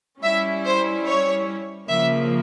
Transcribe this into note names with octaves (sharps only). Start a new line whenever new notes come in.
G3 C#4 E4 E5
C5
C#5
C#3 F3 A#3 E5